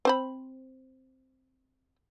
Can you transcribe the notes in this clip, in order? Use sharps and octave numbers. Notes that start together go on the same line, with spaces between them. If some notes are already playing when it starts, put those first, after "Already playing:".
C4 C5 B5